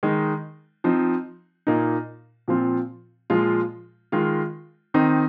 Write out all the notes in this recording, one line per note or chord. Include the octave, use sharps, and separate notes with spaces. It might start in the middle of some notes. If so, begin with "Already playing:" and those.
D#3 G#3 D#4
F3 C4 D#4
A#2 A#3 D#4
A#2 F3 C4 F4
A#2 F3 G#3 F4
D#3 G#3 F4
D#3 C4 D#4